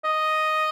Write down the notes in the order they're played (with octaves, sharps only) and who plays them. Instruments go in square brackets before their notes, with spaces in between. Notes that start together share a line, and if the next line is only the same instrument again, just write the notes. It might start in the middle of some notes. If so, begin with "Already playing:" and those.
[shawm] D#5